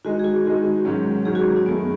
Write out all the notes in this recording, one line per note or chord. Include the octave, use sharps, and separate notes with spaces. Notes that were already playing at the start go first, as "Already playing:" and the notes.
D#3 G#3 D#4 F#4
G#4
F#4
D#3 G#3 D#4
G#2 D#3 F#3 C#4
G#2 D#3 F#3 C#4 G#4
F#4
D#4
F#2 D#3 A3 B3